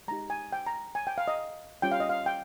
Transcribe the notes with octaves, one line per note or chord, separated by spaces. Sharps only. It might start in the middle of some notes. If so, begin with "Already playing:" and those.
G#3 D#4 G4 A#5
G#5
G5
A#5
G#5
G5
F5
D#5
G3 C#4 F4 G5
F5
D#5
F5
G5